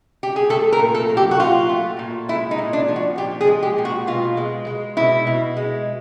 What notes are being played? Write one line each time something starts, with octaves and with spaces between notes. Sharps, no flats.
G4
G#4
A3 A4
A#4
A#2
A4
F#3
G4
F#4
A#2 F4
A3
A#2
G#3 E4
D#4
A#2
D4
F3
F#4
A#2 G4
G#4
G#3
G4
A#2
F#4
B2 F4
G#3
G#3
B2 E4
B2
G#3